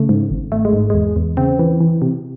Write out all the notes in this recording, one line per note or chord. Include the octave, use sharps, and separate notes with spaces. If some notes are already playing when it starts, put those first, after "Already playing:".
Already playing: C#3 A3
G#2
G#1
G#1 A3
G#3
G#2
E2 G#3
E2
C#3 C4
E3
E3
C3